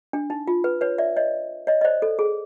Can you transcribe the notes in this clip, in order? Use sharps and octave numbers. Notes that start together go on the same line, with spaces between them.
D4
D#4
F4
B4
B4 C#5
D5 E5
C#5 D#5
C#5 D#5
D#5
C5 D5
A4
G#4